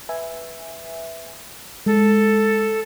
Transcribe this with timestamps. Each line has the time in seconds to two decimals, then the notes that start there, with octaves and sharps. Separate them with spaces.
0.09 B4 E5 G#5
1.86 G#3 A4